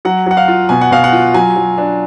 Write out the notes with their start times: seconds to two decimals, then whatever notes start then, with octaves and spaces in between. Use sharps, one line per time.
0.05 F#3 F#5
0.26 F#3 F#5
0.37 F5
0.48 F4
0.69 B2 G#5
0.81 F#5
0.91 B2 F5
1.04 F#5
1.12 F4
1.34 F#3 G#5
1.56 F#3
1.78 D4